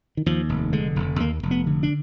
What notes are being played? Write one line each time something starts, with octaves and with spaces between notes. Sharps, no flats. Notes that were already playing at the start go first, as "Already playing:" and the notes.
D#3
D#2 F3
F1
D3 G#3
F1
D#2 A#3
F1
B3
D3
D4